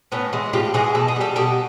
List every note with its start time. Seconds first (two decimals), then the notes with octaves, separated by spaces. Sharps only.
0.12 A2 B3 C#4
0.33 E3 G#3
0.53 A2 F4 G4
0.74 E3 G#3 F#4 G#4
0.95 B2 A4
1.08 G#4
1.16 G3 G4 A4
1.36 B2 G4 A4